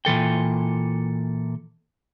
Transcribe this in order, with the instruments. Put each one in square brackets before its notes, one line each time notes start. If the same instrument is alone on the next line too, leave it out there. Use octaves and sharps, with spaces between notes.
[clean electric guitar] A#2 E3 A4 G5